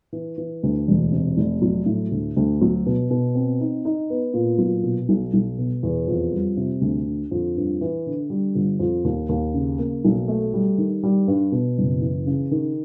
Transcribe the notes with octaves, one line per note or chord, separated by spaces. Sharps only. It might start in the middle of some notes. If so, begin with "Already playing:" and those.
E3
E3
D2
E1
C3
F1
F#3
A2
D2
D2
F#3
B2
B2
C4
D#4
D#4
B3
A#2
F#3
B2
B1
B1
B2
E2
F2
G3
C3
D2
D3
F2
G2
E3
D3
G3
G1
F2
D#2
D#2
C#3
A#3
B1
A3
G3
D#3
G3
G2
B2
F#1
E3
C#3
D#3